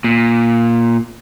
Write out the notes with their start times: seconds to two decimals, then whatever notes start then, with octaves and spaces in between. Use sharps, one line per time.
0.04 A#2